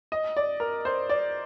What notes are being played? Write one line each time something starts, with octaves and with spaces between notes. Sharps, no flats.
D#5
D5
A#4
C5
D5